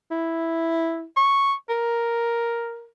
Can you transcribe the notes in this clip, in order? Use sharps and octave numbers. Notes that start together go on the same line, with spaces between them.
E4
C#6
A#4